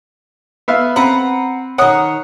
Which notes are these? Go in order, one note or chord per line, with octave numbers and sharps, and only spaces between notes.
B3 E5 F5
C4 B4 F#5 A#5 B5
D#3 C#5 F#5 D#6